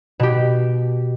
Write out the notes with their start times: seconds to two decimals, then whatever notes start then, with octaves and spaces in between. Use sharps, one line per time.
0.20 B2 G4